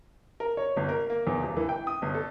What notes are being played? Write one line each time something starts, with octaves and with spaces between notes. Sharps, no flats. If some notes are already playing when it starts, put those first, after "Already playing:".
A#4
C#5
G1
A#4
A#3
E2
D#1
E3
G5
D#6
G1
A4